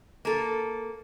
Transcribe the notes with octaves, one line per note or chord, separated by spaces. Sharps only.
A#3 A4